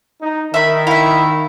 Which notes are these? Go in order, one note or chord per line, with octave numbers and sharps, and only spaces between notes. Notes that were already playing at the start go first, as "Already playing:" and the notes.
D#4
D#3 E5 B5
E4 E5 F5